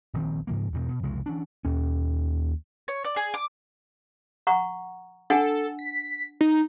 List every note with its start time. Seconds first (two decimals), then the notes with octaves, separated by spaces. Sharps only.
0.13 D#1 A#1 D#3 C4
0.47 G#2 C#3 F3 A#3
0.73 E2 G2 B2
0.88 B2
1.03 C2 F2 C#3 G#3
1.26 E3 C#4 D4
1.65 D#2 C#4
2.88 C#5
3.04 D5
3.16 G#4
3.34 D6
4.47 F#5 A#5 C#6
5.30 D4 A4 F#5 G#5
5.79 B6
6.41 D#4